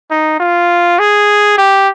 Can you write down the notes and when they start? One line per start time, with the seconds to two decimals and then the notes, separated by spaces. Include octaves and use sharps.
0.11 D#4
0.40 F4
0.99 G#4
1.58 G4